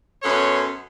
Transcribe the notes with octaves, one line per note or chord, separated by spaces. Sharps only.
F#2 B3 A4 C#5 C6